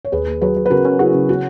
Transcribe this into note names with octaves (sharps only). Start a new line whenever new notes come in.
C#5
D#2 G#4 B4
D#2
F#3 G#4 B4
F#3
B4
C#3 F#4 A#4
C#4
E4 F#4 G#4
C#3
F#4